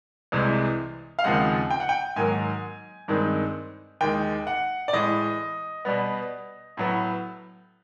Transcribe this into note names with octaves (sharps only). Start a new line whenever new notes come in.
C2 C3 E3 G#3
F5
D#2 C#3 F3 G#3 C4 F#5
G5
F#5
G5
G#2 D#3 F#3 A#3 G#5
G2 D#3 G#3 C4
D#2 D#3 G#3 G5
F#5
D5
A2 E3 G#3 D#5
B2 G3 B3
A2 F#3 B3